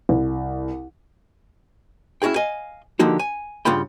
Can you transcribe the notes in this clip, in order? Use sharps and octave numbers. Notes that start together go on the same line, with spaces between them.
C2
C#4 E4 F#4 G#4 G5
D#5 F5 G#5
D3 F3 A#3 D#4 F#4 G4
G#5
G2 C#3 F4 F#5 G5 B5